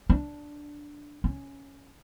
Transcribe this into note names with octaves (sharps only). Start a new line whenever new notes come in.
D4
C#4